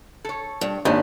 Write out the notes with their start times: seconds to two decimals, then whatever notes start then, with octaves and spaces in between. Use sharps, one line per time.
0.24 A4 C#5
0.61 G2
0.85 G#1 D#2 D4 G4 D#5